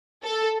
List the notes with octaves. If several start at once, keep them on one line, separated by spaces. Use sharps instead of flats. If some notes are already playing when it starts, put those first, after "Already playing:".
A4